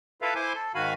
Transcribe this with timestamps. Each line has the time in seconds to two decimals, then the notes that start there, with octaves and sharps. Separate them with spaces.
0.22 E4 F4 A4 B4 E5 F5
0.35 E4 C5 G#5 C6 D6
0.55 A4
0.75 G#2 D#3 F#4 F5 G#5 B5